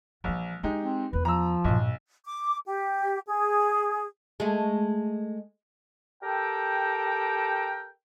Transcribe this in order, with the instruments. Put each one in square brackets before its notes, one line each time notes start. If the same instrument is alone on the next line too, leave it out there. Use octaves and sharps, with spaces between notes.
[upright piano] A#1 [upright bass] E3 G3
[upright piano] G#3 D#4 G4 [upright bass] D4
[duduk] C4
[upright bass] E2 B3 [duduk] B4
[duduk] F3 [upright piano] A#5 E6
[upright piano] B1 [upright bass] G2 A#2
[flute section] D6
G4
G#4
[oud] G#3 A3
[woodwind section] G4 A4 A#4 G5